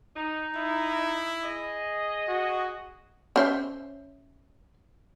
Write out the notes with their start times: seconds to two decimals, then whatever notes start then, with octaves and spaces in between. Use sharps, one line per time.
0.16 D#4
0.57 E4
1.43 G#4 D#5
2.28 F#4
3.36 C#4 C5 E5